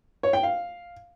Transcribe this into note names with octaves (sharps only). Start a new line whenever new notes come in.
C#5
G5
F5